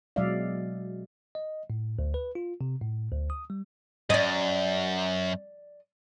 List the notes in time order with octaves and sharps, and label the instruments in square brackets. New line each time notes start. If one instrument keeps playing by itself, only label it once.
[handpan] B2 F#3 G#3 D5 E5 F5
[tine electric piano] D#5
A2
D2
B4
F4
C3
A2
D2
D#6
G3
[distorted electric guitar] F#2 [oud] D5 D#5